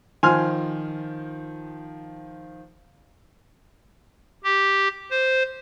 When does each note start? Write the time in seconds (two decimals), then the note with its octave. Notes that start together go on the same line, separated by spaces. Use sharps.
0.23 D#3 F3 G#5 C6 F6
4.44 G4
5.11 C5